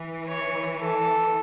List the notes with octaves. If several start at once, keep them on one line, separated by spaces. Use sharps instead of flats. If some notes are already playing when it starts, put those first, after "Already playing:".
Already playing: E3
C#5
A4